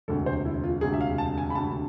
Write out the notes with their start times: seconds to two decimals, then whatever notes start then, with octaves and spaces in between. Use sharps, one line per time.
0.08 E1 D2 C3 A4
0.26 C5
0.45 E4
0.64 F4
0.81 E1 D2 C3 G#4
0.94 E5
1.01 F5
1.18 A5
1.38 G#5
1.50 B5
1.55 E1 D2 C3 A5